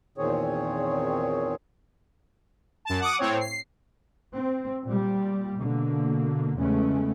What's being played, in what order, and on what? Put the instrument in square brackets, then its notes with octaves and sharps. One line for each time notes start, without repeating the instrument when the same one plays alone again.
[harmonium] E2 A#2 D#3 C4 G#4 C#5
[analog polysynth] F#2 A5
F#5 D6 D#6
A2 C4 C#5
C7
[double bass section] C4
A#2 G3
B2 D3 A#3
E2 C#3 G#3 A3 B3 C#4